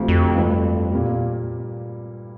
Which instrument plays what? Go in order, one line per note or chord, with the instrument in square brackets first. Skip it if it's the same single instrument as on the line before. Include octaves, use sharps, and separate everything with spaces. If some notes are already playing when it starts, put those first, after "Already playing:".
Already playing: [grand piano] D2 C3 F3 A3
[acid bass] F2
[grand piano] G2 F3 A3
A#2 G3 A#3